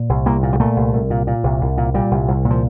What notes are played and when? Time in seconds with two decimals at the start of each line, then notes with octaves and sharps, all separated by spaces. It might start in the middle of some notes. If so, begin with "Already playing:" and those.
Already playing: A#2
0.09 C2
0.26 C2 A#3
0.43 A#2
0.53 G3
0.60 A#2 A3
0.76 C2
0.93 C2
1.10 A#2
1.27 A#2
1.44 C2
1.61 C2
1.78 A#2
1.94 A#2 G3
2.11 C2
2.28 C2
2.45 A#2
2.50 F3